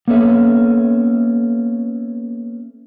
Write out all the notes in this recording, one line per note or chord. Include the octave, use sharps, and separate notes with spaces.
A#3 B3 C#4 A4 E5